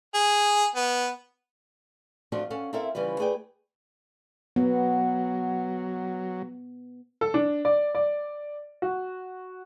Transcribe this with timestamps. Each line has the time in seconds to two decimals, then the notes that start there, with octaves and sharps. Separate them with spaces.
0.14 G#4
0.75 B3
2.32 F3 A3 C4 D4 F4 F#4
2.50 C#4 A4 F5 F#5
2.73 C4 E4 A4 A#4 E5 F5
2.95 C#3 E3 F3 G3 B4
3.19 A3 G#4 B4 D5 G5
4.56 F#3 B3
7.21 A4
7.34 D4
7.65 D5
7.95 D5
8.82 F#4